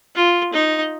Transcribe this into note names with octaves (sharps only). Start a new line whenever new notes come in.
F4
D#4